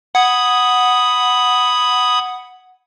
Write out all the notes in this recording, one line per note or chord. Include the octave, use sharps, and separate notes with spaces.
F#5 B5 D#6 G#6